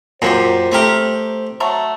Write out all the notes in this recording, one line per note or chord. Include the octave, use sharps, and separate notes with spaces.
F#2 A#2 G#3 C4 G4 C5
G3 A3 C4 G4 A#4
F#3 A3 A#5